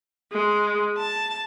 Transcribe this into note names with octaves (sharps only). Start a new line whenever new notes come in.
G#3
A5